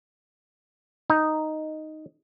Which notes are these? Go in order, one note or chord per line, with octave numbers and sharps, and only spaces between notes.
D#4